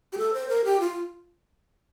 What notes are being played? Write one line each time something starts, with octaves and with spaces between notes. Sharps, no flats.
G4
A4
C5
A#4
G4
F4